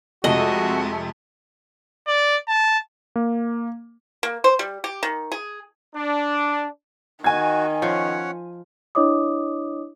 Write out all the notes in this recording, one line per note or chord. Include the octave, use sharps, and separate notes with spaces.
F2 C3 G#3 A3 F#4 D#5
D5
A5
A#3
A#3
C5
G3
G4
D#3
G#4
D4
D#3 F#4 G#5 G#6
F3 C#4 C#5 F#5
D4 E4 C#5 D#5 D6 D#6